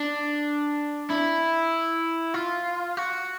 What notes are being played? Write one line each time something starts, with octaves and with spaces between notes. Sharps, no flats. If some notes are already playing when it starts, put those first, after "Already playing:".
Already playing: D4
E4
F4
F#4